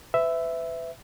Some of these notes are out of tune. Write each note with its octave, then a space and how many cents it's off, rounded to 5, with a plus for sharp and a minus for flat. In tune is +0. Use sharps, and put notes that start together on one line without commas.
B4 +40 E5 +0